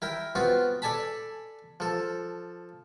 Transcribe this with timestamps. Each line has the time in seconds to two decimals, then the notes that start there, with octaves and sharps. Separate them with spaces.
0.02 E4 A#4 G5
0.35 B3 C4 F4 F#4
0.82 A4 D5 G#5 A5 B5
1.80 F3 A4